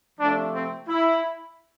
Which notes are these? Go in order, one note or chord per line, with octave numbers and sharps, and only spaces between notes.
C3 F3 A3 D4
C4
E4